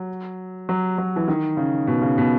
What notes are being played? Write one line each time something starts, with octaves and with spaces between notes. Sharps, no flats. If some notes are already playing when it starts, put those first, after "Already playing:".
Already playing: F#3
F#3
F#3
E3
D#3
C#3
B2
C#3
B2